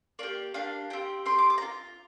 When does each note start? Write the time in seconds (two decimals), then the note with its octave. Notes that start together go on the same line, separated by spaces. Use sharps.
0.19 A#3 D4 G4 D5
0.54 A#3 D4 G4 F5
0.90 C4 G4 G5
1.26 C4 G4 C6
1.38 D6
1.50 D6
1.58 A#5
1.62 F4